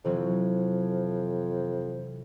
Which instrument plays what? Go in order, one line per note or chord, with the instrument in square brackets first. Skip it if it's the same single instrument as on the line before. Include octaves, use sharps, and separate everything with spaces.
[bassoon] F2 [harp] C3 E3 F#3